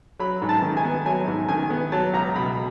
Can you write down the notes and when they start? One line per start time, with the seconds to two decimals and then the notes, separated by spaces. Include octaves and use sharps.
0.19 F#3 B5
0.42 G#2
0.49 A5
0.62 D#3
0.77 G#5
0.84 B3
1.05 F#3 G#5
1.27 G#2
1.48 D#3 G#5
1.70 B3
1.92 F#3 A5
2.13 C#2 A#5
2.36 B2 B5